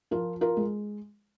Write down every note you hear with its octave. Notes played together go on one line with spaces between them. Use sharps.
F3 F4 A#4
F4 A#4
G#3